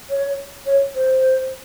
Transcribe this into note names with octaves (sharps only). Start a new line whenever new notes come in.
C#5
C#5
C5